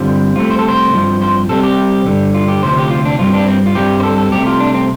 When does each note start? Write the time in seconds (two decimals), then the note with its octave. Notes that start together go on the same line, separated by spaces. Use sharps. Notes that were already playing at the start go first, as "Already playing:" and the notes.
Already playing: G2 D3 G3 C4 F4
0.36 C2 C3 A3 C4 F4
0.51 C5
0.59 A4
0.68 C5
0.93 G2 F3 C4
1.21 C5
1.49 C2 C3 G3 C4 A4
1.63 G4
2.05 G2 D3 G3
2.34 F4
2.48 G4
2.63 D2 C3 F3 C4 C5
2.77 G4
2.91 F4
3.05 D4
3.19 G2 G3 C4 F4
3.33 D4
3.48 C4
3.66 F4
3.75 G2 G3 C4 G4
4.00 C5
4.03 A4
4.18 A4
4.32 C2 C3 A3 G4
4.46 F4
4.60 D4
4.74 C4